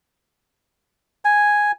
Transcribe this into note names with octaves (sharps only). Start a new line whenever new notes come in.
G#5